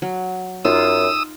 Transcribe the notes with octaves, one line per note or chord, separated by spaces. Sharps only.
F#3
F#2 D#4 F4 D#6 E6